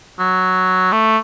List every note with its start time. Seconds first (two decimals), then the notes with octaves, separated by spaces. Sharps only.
0.19 F#3
0.92 A3